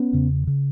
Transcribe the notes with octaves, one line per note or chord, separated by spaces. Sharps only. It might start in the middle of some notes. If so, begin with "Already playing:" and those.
Already playing: B3 C#4
E2 C#3
C#3